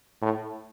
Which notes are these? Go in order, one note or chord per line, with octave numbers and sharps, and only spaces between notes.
A2